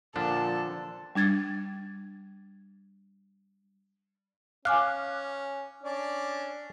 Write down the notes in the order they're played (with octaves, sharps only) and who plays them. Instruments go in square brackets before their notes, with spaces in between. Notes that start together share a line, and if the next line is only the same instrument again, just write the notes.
[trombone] A#2 [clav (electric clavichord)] D3 F3 D4 [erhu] A4
[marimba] G3 D4 G#6 A6
[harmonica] C#4 [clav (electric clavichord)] F5 [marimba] G#5 D6 F#6
[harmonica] C#4 D4 D5